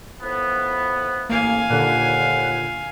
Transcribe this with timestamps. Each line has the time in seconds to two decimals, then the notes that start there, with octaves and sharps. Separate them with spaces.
0.22 A2 F3 B3
1.29 A1 A#3 F5 G#5
1.70 D#2 A#2 D3 F#5